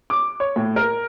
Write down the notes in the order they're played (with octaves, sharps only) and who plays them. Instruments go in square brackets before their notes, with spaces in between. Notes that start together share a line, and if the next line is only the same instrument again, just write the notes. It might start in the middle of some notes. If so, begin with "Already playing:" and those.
[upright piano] D6
C#5
A2
A#4